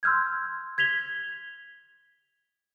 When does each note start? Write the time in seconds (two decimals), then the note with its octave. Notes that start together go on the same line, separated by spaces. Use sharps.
0.03 C6 E6 F6 G6 G#6
0.78 G#6 B6 F7 G7